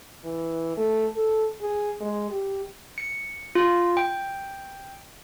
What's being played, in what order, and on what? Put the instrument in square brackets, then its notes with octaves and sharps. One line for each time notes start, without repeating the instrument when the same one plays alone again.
[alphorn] E3
A3
A4
G#4
G#3
G4
[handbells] C#7
F4
G5